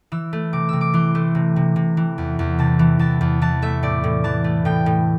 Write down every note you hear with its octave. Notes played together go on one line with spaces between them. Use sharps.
E3 E6
A3
C3 D6
C3 E6
D6
E3 C6
A3
C3
C3
C3
E3
E2
E2
C3 A5
E3
E2 A5
E2
E3 A5
A3 E5
A2 D5
A2
E3 A5
A3
A2 G5
A2